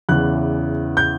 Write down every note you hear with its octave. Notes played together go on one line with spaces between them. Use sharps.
E2 C#3 E3 F#6
G6